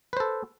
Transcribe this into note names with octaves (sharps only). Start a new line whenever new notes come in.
A4 B4 C5